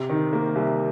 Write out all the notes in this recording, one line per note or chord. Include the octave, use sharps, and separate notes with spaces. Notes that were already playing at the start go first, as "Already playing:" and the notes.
Already playing: C3
D#3
A#3
C2